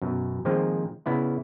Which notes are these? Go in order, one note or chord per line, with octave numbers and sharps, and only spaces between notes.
F#2 B2
D#3 F3 G#3 A#3 C4 F4
C#3 B3 E4 D5